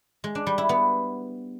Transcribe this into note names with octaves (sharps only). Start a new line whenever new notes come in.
G#3
D4
G3
E4
B3